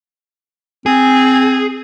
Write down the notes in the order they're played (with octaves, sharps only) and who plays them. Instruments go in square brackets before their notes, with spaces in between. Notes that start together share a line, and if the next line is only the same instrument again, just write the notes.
[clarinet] C4 [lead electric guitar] G#4